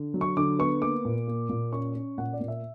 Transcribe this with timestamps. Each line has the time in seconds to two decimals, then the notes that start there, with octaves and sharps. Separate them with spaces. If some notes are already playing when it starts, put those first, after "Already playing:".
Already playing: D3
0.14 F#3
0.21 C#6
0.37 D3 D6
0.59 B3 C#6
0.82 A#3 D6
1.05 A#2
1.28 A#3
1.49 A#2
1.73 C#4 C#6
1.95 C#4
2.18 A#2 F#5
2.33 D5
2.41 A#2
2.48 E5